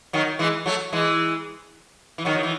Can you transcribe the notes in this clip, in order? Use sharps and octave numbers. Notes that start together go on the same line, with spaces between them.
D#3 F#3
E3 G#3
F#3 A3
E3 G#3
E3
D#3 F#3
F#3
E3